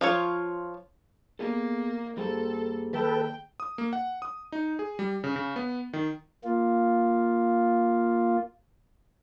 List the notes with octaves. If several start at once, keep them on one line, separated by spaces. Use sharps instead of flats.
F3 F4 C#5
A#3 B3 G#4 A4
G2 G3 A#3 G#4 A4 C5
D#3 A4 B4 G5 A5
D#6
A#3
F#5
D#6
D#4
G#4
G3
C#3
C#3
B3
D#3
A#3 F4